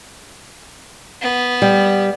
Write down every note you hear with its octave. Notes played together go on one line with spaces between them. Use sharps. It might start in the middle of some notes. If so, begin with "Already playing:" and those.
B3
G3